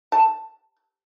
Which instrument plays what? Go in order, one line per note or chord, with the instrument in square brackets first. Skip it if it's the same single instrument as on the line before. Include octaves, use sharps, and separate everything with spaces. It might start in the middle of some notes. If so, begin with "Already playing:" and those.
[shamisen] A5